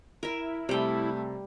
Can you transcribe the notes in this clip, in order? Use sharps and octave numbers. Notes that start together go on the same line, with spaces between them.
E4 A#4 E5
C3 G3 A3 G5